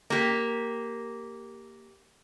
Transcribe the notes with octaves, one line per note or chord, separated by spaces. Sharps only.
A#3 G4